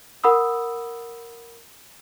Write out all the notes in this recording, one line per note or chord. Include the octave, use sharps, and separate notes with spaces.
A#4 F#5 B5 D#6 E6